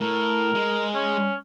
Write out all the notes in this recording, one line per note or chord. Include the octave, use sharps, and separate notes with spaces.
A2 A#4
G#3
C#4